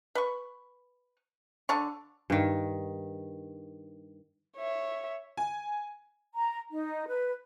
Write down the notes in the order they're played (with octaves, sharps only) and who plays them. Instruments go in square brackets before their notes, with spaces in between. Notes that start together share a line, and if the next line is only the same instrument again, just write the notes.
[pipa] B4 C#6
D3 A4 C#6
[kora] G2 D#3
[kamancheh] C#5 E5
[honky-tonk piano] G#5
[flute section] A#5
D#4
B4